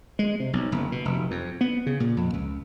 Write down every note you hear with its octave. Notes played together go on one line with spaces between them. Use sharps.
G#3
C3
B1
F#1
B2
F1
F2
B3
C#3
A#2
F2
C#2